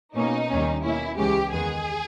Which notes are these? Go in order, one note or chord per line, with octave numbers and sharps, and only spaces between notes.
B2 A#3 C#4 D#4
D#2 D#3 G3 A#3 C#4
B2 A#3 C#4 E4
C#2 C#3 E3 G#3 C#4 G4
E2 D#3 G#3 B3 G#4